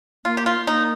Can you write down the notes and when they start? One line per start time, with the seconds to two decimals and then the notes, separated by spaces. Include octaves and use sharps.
0.25 A#3 F4
0.37 G4
0.46 F4
0.67 A#3 D#4